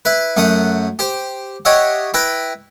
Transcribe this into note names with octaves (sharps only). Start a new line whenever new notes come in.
E4 B4
F#2 A3 F#5 D#6
G4 C5
G4 C#5 D#5 E5 F#5
E4 B4 G5 A#5